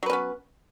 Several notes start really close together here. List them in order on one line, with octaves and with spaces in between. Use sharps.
F#3 B4 C#4 B3